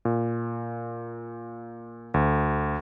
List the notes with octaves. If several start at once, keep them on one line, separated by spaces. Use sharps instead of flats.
A#2
D2